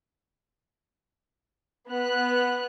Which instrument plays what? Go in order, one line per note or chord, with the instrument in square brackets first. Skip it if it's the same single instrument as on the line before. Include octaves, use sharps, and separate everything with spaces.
[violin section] B3 F#6